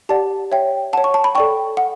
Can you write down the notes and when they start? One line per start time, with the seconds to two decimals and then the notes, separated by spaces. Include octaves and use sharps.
0.09 G4 D5 F#5 A5
0.52 C#5 E5 G5
0.93 C#5 F#5 A5
1.04 C#6
1.14 A5
1.24 B5
1.35 A4 D5 G5 C#6
1.77 F#5